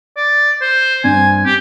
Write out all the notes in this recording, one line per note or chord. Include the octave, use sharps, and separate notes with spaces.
D5
C5
G2 C4 D4 G#5
G4